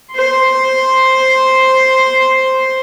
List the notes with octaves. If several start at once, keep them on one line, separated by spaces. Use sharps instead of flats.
C5 C6